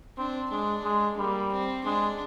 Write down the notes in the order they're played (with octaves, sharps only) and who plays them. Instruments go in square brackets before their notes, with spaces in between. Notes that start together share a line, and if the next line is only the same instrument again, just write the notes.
[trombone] C4 [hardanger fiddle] D4
[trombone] G#3 [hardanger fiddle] D4
[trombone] G#3
[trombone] G3 [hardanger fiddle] A#3
[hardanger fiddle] C4
[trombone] G#3 [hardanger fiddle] D4